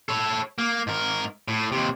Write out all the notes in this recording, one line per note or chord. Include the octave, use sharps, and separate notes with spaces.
A4 C#5
A#3
G#2 A#4
A2
D#2 C3